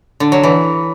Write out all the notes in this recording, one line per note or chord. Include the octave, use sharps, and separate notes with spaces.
D3
F#3
E3